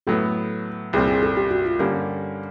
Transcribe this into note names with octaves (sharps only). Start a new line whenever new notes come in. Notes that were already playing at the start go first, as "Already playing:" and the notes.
A2 F#3 B3 A4
C2 A#2 G3 C4 G#4
G#4
A4
G4
F#4
F4
G2 D3 G3 A#3 C#4 G4